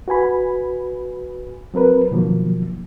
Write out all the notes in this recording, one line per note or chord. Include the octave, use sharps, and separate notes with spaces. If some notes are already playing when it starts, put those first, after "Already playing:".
F#4 B4 G#5 B5
F#3 C4 A#4 B4
B2 D#3 F3 F#3 A#3